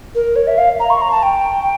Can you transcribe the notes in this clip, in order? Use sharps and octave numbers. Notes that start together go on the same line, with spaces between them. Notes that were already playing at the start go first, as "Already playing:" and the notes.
A#4
C#5
E5
F5
A#5
C#6
A#5
A5
G5